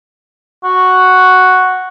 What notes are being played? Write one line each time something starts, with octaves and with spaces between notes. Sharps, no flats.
F#4